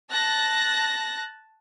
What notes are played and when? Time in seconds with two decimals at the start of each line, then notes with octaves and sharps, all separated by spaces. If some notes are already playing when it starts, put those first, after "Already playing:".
0.10 A5 F#6 A#6